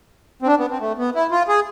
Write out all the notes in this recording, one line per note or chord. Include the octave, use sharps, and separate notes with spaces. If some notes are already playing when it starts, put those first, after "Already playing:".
C4
D4
B3
C4
A3
B3
E4
F4
G#4